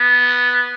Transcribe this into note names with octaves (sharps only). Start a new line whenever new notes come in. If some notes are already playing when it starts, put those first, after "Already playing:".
Already playing: B3